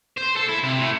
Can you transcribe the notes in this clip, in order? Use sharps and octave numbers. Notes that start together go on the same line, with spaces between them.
C5
A4
E4
C3
A2